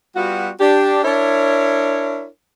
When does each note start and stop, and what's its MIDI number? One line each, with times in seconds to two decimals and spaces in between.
0.16 0.49 55
0.16 0.49 59
0.16 0.49 65
0.16 0.49 66
0.59 1.01 62
0.59 1.01 67
1.04 2.26 62
1.04 2.26 64
1.04 2.26 70
1.04 2.26 73